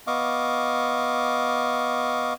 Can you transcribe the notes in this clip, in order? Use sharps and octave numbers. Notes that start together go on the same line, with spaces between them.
B3 D#5 F5 C#6 D6